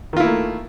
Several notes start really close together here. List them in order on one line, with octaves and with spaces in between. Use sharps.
D#3 F4 E4 A#3 A3